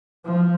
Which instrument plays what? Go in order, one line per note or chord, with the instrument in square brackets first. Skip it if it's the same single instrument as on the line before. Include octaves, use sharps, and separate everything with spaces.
[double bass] F3